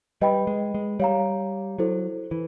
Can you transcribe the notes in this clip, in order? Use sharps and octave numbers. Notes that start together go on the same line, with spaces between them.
G3 B4 D#5 G5 B5
G#3
G#3
G3 C#5 F5 A#5
F#3 E4 A4 C5
E3